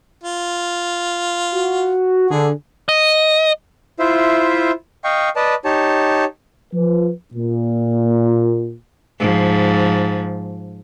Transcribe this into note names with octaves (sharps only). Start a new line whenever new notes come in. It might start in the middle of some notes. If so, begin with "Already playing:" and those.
F4
F#4
D3 G#4
D#5
E4 F4 C5 E5
D#5 F5 G5 C#6
B4 D5 D#5 A5
D#4 G4 C#5 A5
F3 B4
A#2
G#2 F3